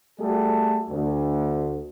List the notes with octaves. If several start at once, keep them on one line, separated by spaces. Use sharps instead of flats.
G3 A3 F#4 G#4 A4
D2